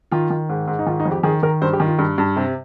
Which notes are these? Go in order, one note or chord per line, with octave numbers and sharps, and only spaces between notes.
D#3 F4
D#3
G#2
G#2
D#4
D#3 F4
D#4
F2
G4
D#3 G#4
D#3 A#4
G2 C5
G4
D#3
F4
G2
G2
C3